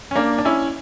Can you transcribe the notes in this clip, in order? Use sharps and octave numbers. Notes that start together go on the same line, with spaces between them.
C#4
A#3 D4
D4
C#4 E4